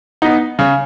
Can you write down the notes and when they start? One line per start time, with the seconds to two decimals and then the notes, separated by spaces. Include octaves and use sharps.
0.22 B3 D#4
0.59 C#3